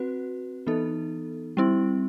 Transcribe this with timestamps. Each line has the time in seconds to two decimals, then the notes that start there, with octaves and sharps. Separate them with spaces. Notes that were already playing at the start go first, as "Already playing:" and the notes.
Already playing: C4 F#4 B4
0.67 E3 B3 D#4 A4
1.57 G3 C4 E4